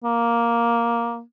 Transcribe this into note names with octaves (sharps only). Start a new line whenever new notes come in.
A#3